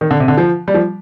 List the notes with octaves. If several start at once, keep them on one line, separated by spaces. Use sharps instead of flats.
D#3
D3
C3
D3
F3
G3
F3